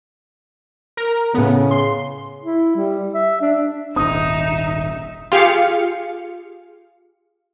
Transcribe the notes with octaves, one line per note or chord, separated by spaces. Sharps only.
A#4
A2 C#3 B3
C6
E4
G3
E5
D4
D#1 G#1 D4 D#4 E5 D#6
F4 G4 G#4 F5 C#7